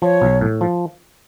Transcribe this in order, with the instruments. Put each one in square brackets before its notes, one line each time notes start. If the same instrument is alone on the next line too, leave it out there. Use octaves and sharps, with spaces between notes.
[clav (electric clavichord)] F3 [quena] C#5
[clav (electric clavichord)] B1
A2
F3